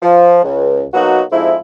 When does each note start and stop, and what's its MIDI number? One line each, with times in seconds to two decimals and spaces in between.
0.02 0.43 53
0.43 0.83 37
0.94 1.22 47
0.94 1.22 54
0.94 1.22 58
0.94 1.22 63
0.94 1.22 66
1.32 1.55 41
1.32 1.55 44
1.32 1.55 53
1.32 1.55 56
1.32 1.55 64